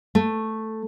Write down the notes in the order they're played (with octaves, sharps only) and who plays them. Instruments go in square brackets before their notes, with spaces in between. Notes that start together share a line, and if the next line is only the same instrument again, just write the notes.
[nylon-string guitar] A3